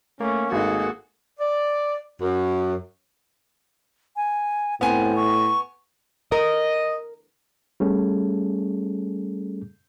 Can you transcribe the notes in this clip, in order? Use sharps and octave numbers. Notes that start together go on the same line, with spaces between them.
A3 A#3 C#4
G#1 D#4 F#4 G#4 A4
D5
F#2
G#5
A2 B3 C4 G#5
C#6
A#4 D#5
G3 A3 C#4 G#4 A4